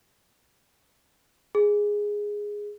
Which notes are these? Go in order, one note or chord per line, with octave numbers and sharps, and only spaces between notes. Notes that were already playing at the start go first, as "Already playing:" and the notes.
G#4